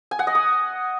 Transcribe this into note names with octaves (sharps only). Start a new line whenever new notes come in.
G#5
F#5
D#5
D#6